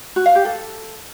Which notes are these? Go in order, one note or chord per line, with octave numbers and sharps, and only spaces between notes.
F#4
F5
G4
A4